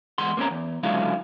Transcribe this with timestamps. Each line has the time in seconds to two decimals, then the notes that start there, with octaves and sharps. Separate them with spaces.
0.18 E2 G#3 F#5 C6
0.37 A#3 C4 C#4 A#4
0.51 E2
0.83 C#2 D3 F#3 G#3 E4 F5